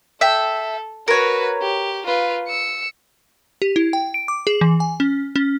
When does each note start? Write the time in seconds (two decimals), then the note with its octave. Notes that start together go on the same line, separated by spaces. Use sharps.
0.21 A4 E5 G5
1.08 F#4 A#4 B4 C#5
1.62 G4
2.06 F4 B4
2.47 E6 C#7
3.62 G4
3.76 E4
3.93 G5
4.14 D7
4.28 D6
4.47 G#4
4.61 E3
4.80 G#5
5.00 C#4
5.36 C#4